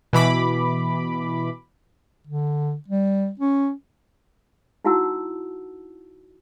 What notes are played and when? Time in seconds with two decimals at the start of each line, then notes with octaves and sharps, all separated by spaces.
0.13 B2 E3 B5 D6
2.27 D3
2.88 G3
3.40 C#4
4.85 D#4 E4 F#4 F#5 A5 E6